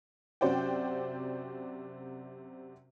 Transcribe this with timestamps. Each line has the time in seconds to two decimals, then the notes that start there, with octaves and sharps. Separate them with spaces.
0.41 F#2 C3 F#4 C5 D5 G5